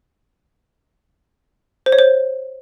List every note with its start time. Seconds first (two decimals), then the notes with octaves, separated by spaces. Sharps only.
1.86 C5
1.92 C#5
1.99 C5